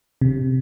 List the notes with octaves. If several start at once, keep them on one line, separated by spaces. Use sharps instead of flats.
C3